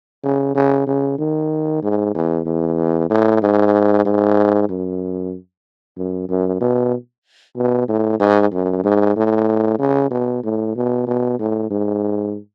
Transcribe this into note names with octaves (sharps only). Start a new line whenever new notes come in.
C#3
C#3
C#3
D#3
G#2
E2
E2
A2
G#2
G#2
F#2
F#2
F#2
B2
B2
A2
G#2
F#2
G#2
A2
C#3
B2
A2
B2
B2
A2
G#2